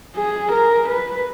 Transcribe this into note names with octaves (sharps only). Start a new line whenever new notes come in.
G#4
A#4
B4